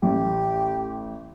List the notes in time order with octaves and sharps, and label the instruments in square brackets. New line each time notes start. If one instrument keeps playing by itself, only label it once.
[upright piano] A1 [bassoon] G4